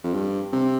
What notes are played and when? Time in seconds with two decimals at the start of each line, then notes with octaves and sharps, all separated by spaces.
0.04 F2
0.14 G2
0.53 C3